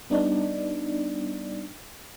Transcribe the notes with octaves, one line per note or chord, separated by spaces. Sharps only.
G3 B3 D4 D#4 D5